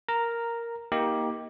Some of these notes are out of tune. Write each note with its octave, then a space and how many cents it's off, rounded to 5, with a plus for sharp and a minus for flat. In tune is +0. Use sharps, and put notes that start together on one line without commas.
A#4 +0 A#5 -5
A#3 +15 D#4 +25 G4 +0